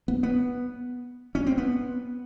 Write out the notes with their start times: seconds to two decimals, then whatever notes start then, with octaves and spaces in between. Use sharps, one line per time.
0.08 B3
0.23 B3
1.35 C#4
1.46 C4
1.58 B3